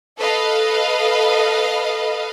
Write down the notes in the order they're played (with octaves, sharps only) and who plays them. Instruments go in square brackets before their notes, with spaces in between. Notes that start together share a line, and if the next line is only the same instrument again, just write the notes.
[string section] A4 B4 D#5 F5